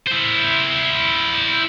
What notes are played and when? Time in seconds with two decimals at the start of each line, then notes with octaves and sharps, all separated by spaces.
0.07 E4 C5